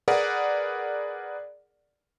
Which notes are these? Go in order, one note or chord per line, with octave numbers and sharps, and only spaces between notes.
G#4 A#4 B4 D5 F#5